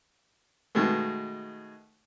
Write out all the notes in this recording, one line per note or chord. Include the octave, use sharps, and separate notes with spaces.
B2 D#3 G#3 A3